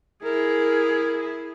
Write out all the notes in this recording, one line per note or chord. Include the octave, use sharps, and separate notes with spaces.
E4 G#4 A#4